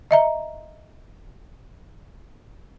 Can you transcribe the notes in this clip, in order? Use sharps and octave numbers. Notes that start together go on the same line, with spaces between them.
D#5 E5 A#5